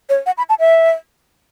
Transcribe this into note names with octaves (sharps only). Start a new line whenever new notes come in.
C#5
F#5
B5
A5
E5